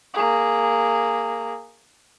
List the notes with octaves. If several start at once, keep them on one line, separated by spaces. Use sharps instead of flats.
A#3 G#4